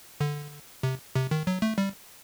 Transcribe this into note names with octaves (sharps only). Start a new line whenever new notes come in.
D3
C3
C3
D#3
F#3
A3
G3